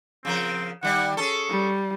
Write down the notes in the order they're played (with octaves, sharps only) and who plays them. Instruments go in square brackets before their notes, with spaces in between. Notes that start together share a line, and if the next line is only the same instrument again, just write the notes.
[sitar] C#3 F3 A#4 [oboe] C4
[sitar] D#3 G3 [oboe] F#5
[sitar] C#4 G#4 A4 [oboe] C#6
[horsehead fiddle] G3